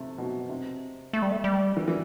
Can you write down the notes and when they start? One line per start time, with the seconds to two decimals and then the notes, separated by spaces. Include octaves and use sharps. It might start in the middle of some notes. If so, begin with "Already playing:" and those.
Already playing: C3 A3
0.18 B2
0.49 C3
1.13 A3
1.22 G3
1.31 A3
1.44 G3
1.77 E3
1.88 E3